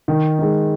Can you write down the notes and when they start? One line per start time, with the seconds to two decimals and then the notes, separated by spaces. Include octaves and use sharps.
0.08 D#3
0.39 G#3 D#4